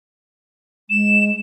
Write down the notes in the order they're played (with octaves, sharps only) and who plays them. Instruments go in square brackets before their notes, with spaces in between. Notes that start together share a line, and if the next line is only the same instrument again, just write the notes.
[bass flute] G#3 [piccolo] E7